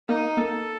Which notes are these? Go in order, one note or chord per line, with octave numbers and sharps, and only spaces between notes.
A#3 D#4
A#3 A4